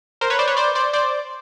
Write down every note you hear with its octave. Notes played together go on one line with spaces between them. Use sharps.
A#4 C5
B4 C#5
C5 D5
B4 C#5
C5 D5
C5 D5
C5 D5